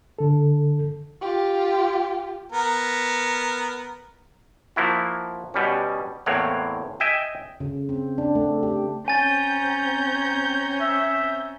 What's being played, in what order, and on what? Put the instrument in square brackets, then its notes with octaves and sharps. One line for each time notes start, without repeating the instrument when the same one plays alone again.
[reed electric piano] D3 A4
[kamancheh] F4 G4
[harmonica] B3 A#4
[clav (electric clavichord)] F3 A#3 E4 F#4
B2 G3 C#4
E2 A2 A#3 C4 C#5 F#5
D#5 E5 G5 G#5
[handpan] C#3
C4
D4
A3
G4
[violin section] C4 A#5 G6 [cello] C#4 [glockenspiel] G#5 A6
[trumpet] E5